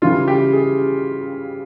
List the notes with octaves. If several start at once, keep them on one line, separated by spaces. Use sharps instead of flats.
C#3 E3 G3 F4
G4
G#4